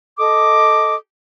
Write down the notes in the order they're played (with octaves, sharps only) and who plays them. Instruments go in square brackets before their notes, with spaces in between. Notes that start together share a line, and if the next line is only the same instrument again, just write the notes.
[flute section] A4 D#5 D6 D#6